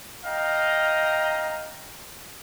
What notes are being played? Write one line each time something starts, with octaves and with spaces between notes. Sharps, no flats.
D#5 F5 G5 A#5